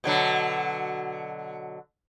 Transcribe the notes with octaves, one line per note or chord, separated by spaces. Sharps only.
B2 D3 F#3